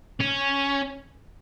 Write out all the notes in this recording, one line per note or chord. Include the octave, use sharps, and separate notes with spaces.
C#4